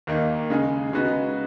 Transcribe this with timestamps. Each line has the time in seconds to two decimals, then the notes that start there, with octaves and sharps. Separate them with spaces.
0.07 D#2 D#3 A#3 D#4
0.50 C#3 G#3 D#4 G#4
0.92 C#3 G#3 B3 D#4 F#4